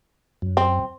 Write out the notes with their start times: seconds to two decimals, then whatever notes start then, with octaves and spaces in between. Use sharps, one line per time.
0.42 F#2
0.57 C4